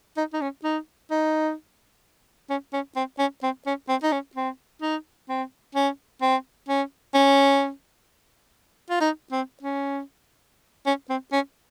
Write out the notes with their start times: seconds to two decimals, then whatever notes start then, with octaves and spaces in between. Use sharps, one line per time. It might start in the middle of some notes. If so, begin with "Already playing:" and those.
0.17 D#4
0.33 D#4
0.41 C#4
0.64 D#4
1.11 D#4
2.50 C#4
2.73 C#4
2.96 C4
3.19 C#4
3.43 C4
3.66 C#4
3.89 C4
4.03 D#4
4.12 C#4
4.35 C4
4.81 D#4
5.29 C4
5.75 C#4
6.21 C4
6.68 C#4
7.14 C#4
8.90 F4
9.00 D#4
9.32 C4
9.63 C#4
10.86 C#4
11.10 C4
11.32 C#4